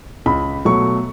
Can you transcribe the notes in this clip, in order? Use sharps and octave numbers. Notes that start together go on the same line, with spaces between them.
C#2 B5
B2 F#3 A3 C#6